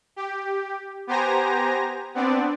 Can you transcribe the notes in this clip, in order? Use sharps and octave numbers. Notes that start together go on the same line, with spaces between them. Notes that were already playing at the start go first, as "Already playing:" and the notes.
G4
B3 G4 C5 G#5 A#5 A#6
B3 C4 D4 D5